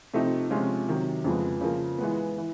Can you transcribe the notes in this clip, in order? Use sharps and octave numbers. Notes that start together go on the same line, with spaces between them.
C3 F3 A3 C4 D#4
C3 F3 G#3 C#4 F4
C3 D#3 F#3
F2 C#3 F3 G#3 B3
C#3 F3 A#3
E3 G#3 B3
E3